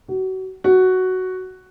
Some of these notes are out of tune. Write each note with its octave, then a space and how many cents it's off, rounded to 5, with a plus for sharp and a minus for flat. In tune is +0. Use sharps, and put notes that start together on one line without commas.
F#4 +30
F#4 +5